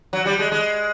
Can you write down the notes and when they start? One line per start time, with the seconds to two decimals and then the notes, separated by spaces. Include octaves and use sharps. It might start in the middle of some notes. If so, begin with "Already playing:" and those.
0.13 F#3
0.26 G3
0.39 G#3
0.52 G#3